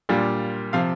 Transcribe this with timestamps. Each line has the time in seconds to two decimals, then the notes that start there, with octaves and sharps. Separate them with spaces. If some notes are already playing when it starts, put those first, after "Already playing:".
0.09 A#2 G3 D4 F4
0.73 C3 F3 F5